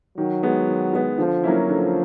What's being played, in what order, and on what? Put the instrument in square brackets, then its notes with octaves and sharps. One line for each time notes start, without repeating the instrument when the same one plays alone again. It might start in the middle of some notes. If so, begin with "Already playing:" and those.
[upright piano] D#3 [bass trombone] F#3
[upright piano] G#3 B3
D#3
G#3 B3
[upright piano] D3 [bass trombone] F3
[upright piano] F#3 A#3 C#4 E4
[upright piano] D3 [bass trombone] F3